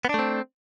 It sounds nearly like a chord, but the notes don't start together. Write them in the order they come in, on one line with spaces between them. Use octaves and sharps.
B3 D4 A3 C4